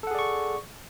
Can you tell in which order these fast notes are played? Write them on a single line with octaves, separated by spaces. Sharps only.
A4 F#5 G#4 D5 C#6